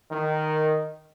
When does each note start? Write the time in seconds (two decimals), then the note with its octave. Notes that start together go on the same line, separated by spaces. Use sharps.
0.11 D#3